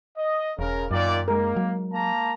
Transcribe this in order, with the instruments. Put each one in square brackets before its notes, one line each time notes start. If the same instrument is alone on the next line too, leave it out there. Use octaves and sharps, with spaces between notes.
[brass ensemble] D#5
[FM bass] E1 [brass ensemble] C#3 A#4
[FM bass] F#2 [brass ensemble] A#2 D#3 D5
[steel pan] G#3 A#4 [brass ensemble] A#3
[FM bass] F#3
[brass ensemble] A#3 A5 A#5